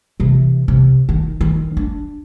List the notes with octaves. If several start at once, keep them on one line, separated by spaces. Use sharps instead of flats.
C3 E3
C3
D#3
D#3
D4